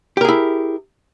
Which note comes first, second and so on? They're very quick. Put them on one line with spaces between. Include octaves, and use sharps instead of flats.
G4 A#4 G#4 E4